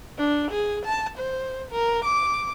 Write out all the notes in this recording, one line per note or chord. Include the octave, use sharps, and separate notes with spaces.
D4
G#4
A5
C5
A#4
D6